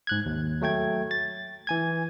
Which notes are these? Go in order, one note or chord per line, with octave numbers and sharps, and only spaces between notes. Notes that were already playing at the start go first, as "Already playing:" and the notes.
G#2 F#6 G#6
D#2
F#3 A3 G5 G#6
A6
E3 G#5 G#6